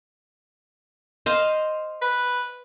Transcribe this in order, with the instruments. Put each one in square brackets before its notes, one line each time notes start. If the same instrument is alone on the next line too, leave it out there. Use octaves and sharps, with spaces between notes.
[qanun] C5 D#5 F5
[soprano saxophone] B4